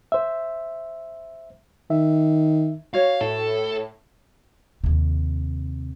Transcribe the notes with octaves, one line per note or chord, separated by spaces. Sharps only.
C5 E5
D#3 E5
F#4 C#5 F5
A2 A4
D#2 C3